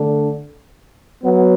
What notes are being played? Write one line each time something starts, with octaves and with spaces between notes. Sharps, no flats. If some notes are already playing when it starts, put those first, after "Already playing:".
Already playing: D3 A3 D4
F#3 B3